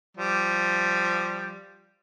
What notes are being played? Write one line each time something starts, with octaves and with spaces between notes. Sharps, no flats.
F3 G3